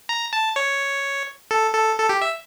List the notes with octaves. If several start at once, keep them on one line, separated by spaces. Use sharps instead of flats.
A#5
A5
C#5
A4
A4
A4
G4
E5